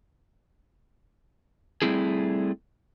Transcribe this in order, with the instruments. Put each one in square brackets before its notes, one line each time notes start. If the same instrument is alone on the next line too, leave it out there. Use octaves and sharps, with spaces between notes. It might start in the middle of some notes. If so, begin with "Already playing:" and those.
[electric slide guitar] G3 A3 C4 E4 G#4